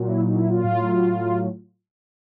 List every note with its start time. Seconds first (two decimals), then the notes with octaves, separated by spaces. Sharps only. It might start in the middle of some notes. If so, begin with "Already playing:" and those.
Already playing: A#2 F#3
0.08 E4
0.22 D#4
0.35 E4
0.50 F4
0.64 A2 F#3